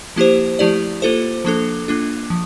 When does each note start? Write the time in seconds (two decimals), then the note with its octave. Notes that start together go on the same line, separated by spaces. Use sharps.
0.16 F3 A#3 E4 G4 C5
0.59 F3 A3 E4 G4 D5
1.02 A#3 F4 A4 C5
1.45 F3 A#3 D4 A4
1.88 A#3 D4 F4
2.30 F3